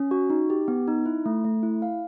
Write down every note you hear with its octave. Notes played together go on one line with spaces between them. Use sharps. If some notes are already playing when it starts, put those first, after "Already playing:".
Already playing: C#4
F#4
D#4
G4
B3
D#4
E4
A3
A3
E4
F5